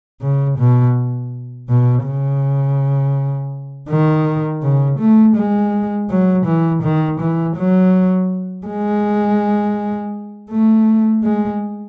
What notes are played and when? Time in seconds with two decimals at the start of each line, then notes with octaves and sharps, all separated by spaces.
0.21 C#3
0.59 B2
1.69 B2
2.05 C#3
3.89 D#3
4.63 C#3
5.00 A3
5.36 G#3
6.10 F#3
6.46 E3
6.83 D#3
7.21 E3
7.56 F#3
8.67 G#3
10.50 A3
11.24 G#3